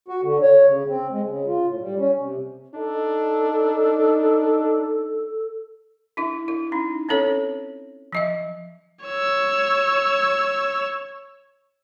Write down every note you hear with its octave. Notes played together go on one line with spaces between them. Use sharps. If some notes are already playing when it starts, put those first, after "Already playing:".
F#4
D3
C#5
C#3
C4
G#3
C#3
F4
A2
G3
C#4
C3
D4 D#4 A4
D4 E4 E5
E4
C#4 D#4
C4 C#4 A4 C#5
F3 D#5 E5
C#5 E6